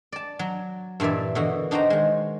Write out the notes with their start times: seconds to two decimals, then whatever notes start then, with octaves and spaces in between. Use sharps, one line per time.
0.12 D5 A5
0.39 F#3
1.00 G2 A#2 E3 D5 E5
1.35 B2 D3 E3 F#4
1.71 D4 D#4 F#4 C5 G5 A#5
1.90 D#3 G#3